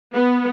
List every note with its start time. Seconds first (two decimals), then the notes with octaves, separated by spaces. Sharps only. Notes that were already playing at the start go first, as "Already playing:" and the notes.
0.13 B3